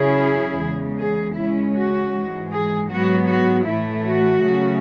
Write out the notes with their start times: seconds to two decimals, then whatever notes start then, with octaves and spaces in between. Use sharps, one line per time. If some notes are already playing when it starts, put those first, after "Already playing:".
Already playing: C#3 F#3 C#4 E4 G#4
0.59 E2 C#3 G#3
0.98 G#4
1.36 C#3 G#3 C#4 E4
1.74 F#4
2.13 G#2 E3 G#3
2.51 G#4
2.90 G#2 F#3 B3 F#4
3.28 F#4
3.67 A2 E3 A3 E4
4.06 F#4
4.43 C#3 F#3 A3 C#4